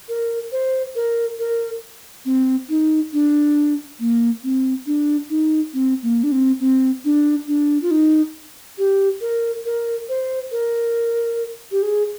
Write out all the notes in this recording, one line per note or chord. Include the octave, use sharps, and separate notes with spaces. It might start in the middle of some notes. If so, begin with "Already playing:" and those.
A#4
C5
A#4
A#4
C4
D#4
D4
A#3
C4
D4
D#4
C4
A#3
D4
C4
C4
D4
D4
F4
D#4
G4
A#4
A#4
C5
A#4
G4
G#4